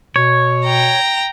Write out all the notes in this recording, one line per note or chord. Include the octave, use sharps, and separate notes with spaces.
B2 C#5
G5 A#5